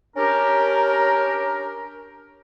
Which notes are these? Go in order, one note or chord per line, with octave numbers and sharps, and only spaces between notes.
C#4 D4 G4 A#4